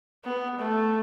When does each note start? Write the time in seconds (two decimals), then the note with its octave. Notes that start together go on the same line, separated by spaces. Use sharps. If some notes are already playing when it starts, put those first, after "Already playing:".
0.25 B3
0.58 A3